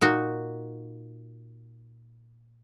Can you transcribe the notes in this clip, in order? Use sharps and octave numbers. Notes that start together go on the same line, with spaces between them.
A#2 D#4 F#4